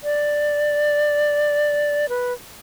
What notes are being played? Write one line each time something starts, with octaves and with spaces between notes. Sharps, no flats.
D5
B4